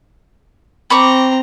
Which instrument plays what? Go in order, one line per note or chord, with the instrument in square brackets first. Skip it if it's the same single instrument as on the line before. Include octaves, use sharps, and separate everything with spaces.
[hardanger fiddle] C4 A#5 [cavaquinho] B5 C#6 D6